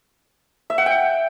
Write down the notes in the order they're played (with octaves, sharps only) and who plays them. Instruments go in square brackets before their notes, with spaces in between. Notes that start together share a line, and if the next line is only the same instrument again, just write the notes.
[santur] E5
F#5
G5